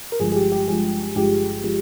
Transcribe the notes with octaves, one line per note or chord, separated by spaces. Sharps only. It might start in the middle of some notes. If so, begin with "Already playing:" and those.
A#4
G1 G2 F3 G#3 G#4
G#4
G4
G4
G1 G2 F3 G#3 G#4
G1 G2 F3 G#3 G4
F3 G#3